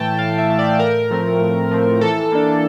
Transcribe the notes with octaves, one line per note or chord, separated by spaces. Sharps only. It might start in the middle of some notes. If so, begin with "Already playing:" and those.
Already playing: A2 E3 A3 G5 A5
A2 F5
E5
E3 A3
D5
A2 A#4
F3 A3 C4
A2
F3 A3 C4
E3 A4
A#3 D4